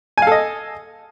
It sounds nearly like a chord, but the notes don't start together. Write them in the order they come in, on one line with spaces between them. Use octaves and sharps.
G#5 F5 A4 D#5